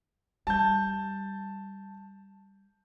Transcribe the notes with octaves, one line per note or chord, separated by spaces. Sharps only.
G3 A5 G6